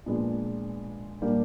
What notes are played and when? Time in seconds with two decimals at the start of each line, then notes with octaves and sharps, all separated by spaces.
0.06 A#2 F3 G#3 B3 D4
1.22 A#2 G3 A#3 D4 G4